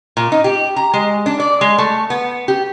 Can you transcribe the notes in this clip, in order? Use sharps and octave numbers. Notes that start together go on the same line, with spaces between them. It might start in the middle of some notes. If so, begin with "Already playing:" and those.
A#2
D#4
G4
A#5
G#3
D4
D5
G#3
A3
B3
G4